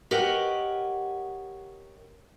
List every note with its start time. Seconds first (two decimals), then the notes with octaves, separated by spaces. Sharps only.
0.11 G4 A#4 C#5 D#5 F#5